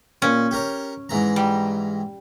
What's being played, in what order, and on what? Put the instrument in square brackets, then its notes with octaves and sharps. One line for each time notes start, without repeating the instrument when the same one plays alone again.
[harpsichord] A#2 [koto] C#4
[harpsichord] G4 A#4 C#5
G#2 E3 A#5
[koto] G3